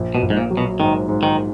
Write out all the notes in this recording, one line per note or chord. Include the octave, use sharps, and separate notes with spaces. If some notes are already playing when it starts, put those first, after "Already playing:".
Already playing: A#1
B2
A#1
G#2
A#2
F#3
B2
G#2 D#3
G#2
D#3